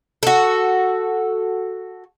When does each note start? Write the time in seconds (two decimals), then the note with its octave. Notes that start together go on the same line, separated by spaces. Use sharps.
0.23 F#4 A4